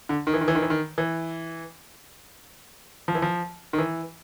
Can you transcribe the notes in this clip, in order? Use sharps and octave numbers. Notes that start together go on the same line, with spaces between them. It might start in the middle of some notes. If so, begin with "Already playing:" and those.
D3
D#3
E3
D#3
E3
D#3
E3
D#3
E3
F3
E3
F3
D#3
E3